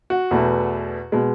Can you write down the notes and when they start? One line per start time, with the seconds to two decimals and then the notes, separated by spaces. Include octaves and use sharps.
0.10 F#4
0.31 E2 B2 A3
1.12 B2 G#3